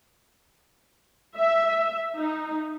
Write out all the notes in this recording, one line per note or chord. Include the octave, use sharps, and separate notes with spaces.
E5
D#4